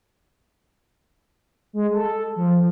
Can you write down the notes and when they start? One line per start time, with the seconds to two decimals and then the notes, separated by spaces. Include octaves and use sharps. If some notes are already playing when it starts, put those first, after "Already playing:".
1.73 G#3
1.93 A4
2.36 F3